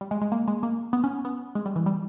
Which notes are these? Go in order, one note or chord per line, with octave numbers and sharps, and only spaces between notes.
G3
G#3
G#3
A#3
G#3
A#3
B3
C#4
B3
G#3
G3
E3
G3